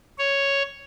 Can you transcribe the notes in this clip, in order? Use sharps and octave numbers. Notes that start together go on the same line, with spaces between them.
C#5